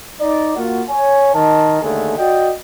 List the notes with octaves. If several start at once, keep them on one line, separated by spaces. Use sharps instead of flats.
D#4 D5
A#3 F4 F#4
C#5 G#5
D#3 A5
D#2 D3 A3 G#4
F#4 D5 D#5 G5